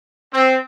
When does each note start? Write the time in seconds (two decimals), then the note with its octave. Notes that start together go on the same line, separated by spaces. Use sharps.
0.33 C4